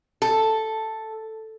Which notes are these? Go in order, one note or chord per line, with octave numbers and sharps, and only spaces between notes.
A4